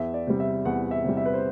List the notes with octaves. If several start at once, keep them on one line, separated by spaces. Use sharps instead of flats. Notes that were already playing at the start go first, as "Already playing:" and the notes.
Already playing: E2 E5
D5
C3 G3
E5
E2 F#5
E5
C3 G3
E5
B4
C5